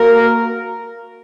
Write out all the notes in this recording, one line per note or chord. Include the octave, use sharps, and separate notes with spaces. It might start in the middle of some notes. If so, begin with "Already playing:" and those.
Already playing: A#3 F#4 A#4